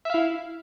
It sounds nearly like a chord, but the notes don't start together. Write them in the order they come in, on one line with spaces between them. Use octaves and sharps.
E5 F5 E4